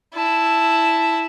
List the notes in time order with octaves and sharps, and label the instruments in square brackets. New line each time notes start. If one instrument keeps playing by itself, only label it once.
[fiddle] E4 A5